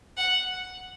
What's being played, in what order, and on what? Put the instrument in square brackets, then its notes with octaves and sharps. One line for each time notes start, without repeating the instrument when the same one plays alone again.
[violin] F#5